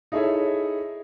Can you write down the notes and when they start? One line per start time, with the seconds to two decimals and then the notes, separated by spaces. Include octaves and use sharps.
0.12 D#4 E4 G#4 A4 C#5 E5